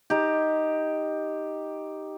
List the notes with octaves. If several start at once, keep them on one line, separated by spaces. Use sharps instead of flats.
D#4 G4